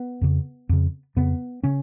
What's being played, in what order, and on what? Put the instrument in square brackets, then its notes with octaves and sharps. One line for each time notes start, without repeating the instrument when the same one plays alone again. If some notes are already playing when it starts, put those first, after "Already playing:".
Already playing: [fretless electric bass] B3
F2 C#3
F2 C#3
F2 C#3 B3
C#3 C#4